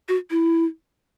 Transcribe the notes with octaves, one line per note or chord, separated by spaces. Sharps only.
F#4
E4